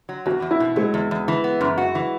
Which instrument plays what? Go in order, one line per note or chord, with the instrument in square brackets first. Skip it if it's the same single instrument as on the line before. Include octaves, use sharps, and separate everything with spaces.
[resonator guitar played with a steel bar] F#3
[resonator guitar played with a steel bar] E2 [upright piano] F#4
[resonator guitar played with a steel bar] E2
[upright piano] E4
[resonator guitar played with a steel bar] B2
[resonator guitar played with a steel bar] F#3 [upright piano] G#3
[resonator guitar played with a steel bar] E2
E2
E3
B3
F#2
F#4
E3